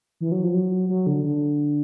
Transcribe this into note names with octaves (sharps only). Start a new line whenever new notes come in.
E3
F#3
F3
F#3
F#3
D3
D3